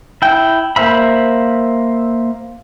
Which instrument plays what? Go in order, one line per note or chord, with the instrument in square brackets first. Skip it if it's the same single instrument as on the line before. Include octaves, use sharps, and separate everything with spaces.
[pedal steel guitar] E4 G5
A#3 C5 E5 B5